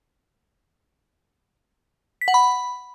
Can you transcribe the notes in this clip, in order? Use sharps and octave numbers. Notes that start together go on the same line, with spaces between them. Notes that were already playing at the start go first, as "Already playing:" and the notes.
B6
F#5
B5